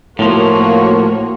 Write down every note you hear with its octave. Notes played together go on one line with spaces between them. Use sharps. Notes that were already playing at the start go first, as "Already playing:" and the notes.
A2 F3 A#3 F#4 C#5